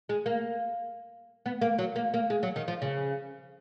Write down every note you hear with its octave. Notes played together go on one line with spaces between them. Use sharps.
G#3
A#3
B3
A#3
F#3
A#3
A#3
G#3
F#3
D#3
F3
C#3